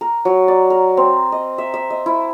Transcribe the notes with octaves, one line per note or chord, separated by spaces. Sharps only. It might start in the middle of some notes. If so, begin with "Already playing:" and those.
A#4
F#3
D5
A#4
C4
D#5
E5
E5
D#5
E4